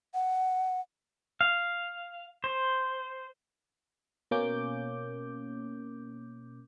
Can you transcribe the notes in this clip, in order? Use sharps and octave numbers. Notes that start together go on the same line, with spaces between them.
F#5
F5
C5
B2 A#3 C#4 D6 G6